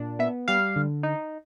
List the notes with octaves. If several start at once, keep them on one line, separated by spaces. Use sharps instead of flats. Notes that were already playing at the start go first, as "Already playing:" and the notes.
Already playing: A#2 D4
B3 E5
G3 F5
D3
D#4